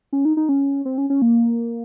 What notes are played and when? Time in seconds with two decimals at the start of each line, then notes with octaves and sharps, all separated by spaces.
0.13 C#4
0.25 D#4
0.37 D#4
0.49 C#4
0.85 C4
0.98 C#4
1.10 C#4
1.22 A#3